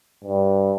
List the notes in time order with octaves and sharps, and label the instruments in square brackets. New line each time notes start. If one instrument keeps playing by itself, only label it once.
[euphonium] G2